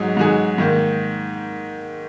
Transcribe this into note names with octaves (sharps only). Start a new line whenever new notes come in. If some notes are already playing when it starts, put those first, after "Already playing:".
Already playing: G#2 F#3 D#4 G#4
G#2 F#3 D#4 G#4
G#2 D#3 A#3